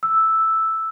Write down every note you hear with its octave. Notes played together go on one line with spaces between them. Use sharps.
E6